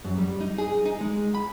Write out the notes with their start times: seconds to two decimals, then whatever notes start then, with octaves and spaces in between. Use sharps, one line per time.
0.05 F#2
0.18 G3
0.41 D#4
0.58 G#4
0.86 D#4
1.01 G#3
1.35 B5